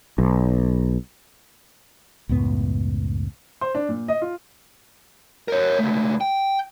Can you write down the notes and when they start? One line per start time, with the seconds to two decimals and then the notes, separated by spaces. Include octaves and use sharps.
0.18 B1
2.29 C#2 F#2 A2 B3
3.61 C5
3.75 D4
3.89 A#2
4.08 D#5
4.22 F4
5.48 A#4 C#5
5.79 C#2 A3
6.21 G5